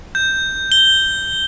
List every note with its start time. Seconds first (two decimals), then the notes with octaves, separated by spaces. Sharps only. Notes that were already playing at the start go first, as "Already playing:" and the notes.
0.15 G6
0.72 G7